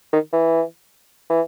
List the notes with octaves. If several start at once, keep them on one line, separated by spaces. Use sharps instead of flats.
D#3
E3
E3